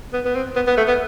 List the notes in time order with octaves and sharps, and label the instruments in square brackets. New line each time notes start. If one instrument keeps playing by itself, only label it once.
[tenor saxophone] B3
B3
C4
B3
B3
A3
B3